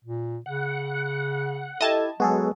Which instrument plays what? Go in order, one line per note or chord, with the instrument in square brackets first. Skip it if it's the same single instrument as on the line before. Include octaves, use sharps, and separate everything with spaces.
[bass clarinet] A#2
[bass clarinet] C#3 [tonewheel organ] F#5
[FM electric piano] E4 G4 G#6 [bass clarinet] A4 [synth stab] D#5 A5
[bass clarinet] F#3 [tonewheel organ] G#3 B3 [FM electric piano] F#4 G#4 A4